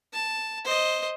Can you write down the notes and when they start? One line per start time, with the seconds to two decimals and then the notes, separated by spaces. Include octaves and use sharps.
0.13 A5
0.65 C5 D#5